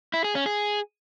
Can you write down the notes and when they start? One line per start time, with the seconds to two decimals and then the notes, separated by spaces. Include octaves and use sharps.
0.14 E4
0.24 G#4
0.35 C#4
0.46 G#4